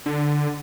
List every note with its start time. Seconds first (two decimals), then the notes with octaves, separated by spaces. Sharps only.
0.06 D3